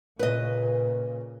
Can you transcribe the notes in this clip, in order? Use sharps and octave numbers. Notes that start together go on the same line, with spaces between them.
A#2 C#3 B4 D#5